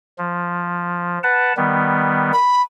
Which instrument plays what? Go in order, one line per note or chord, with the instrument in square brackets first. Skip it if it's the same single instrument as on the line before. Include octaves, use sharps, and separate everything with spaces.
[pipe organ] F3
B4 F#5 A5
D#3 G3 B3
[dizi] B5